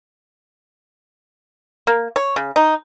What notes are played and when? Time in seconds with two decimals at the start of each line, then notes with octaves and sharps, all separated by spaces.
1.87 A#3
2.16 C#5
2.36 C#3
2.56 D#4